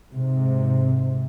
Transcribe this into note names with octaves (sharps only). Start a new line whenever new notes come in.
G#2 C3